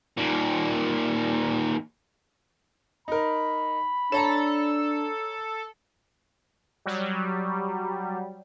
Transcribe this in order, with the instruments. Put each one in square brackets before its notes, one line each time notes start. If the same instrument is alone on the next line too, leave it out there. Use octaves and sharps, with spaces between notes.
[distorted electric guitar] D#2 A#2
[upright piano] D#4 A#4 [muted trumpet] B5
[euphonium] D4 [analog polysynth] A4 [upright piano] C#5 A5 A#5
[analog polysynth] F#3 G3